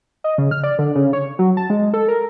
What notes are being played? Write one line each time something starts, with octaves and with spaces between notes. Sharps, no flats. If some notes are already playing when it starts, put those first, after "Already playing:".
D#5
C#3
F6
D5
D3
C#3
C#5
F#3
A5
G#3
A4
A#4